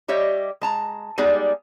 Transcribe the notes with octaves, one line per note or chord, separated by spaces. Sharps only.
G3 G4 C#5 D#5 E5
G#3 A5 A#5
G3 G#3 B3 D#4 G#4 D5